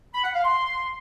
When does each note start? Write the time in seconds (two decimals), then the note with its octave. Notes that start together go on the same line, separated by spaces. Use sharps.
0.14 B5
0.24 F#5
0.34 F5
0.44 C6